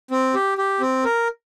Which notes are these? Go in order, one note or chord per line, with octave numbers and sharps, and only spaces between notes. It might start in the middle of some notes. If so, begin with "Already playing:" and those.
C4
G4
G4
C4
A#4